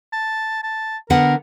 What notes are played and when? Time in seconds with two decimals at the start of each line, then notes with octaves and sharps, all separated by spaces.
0.13 A5
0.63 A5
1.10 D3 B3 A#4 F#5